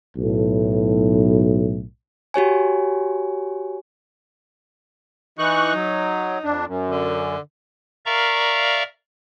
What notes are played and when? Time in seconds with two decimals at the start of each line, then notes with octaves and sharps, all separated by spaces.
0.16 B1 A2
2.34 F#4 G4 C#5 G#5
5.39 E3 D#4 C#6 F#6
5.74 F#3
6.44 F2 D4
6.67 F#2
6.90 D3
8.06 A#4 D5 E5 F5 A#5 C#6